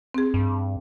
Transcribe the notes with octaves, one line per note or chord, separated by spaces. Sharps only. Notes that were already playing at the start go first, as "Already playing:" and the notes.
C4 G#4
G2